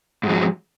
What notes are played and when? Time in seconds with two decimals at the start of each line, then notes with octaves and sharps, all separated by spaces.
0.23 G#2
0.26 F2
0.29 G#3
0.32 F#3